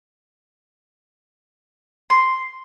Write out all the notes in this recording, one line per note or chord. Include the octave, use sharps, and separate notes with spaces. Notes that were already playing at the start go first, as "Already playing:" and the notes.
C6